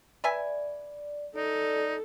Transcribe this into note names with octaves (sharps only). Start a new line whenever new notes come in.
B4 D5 E5 G#5
D#4 A4 D5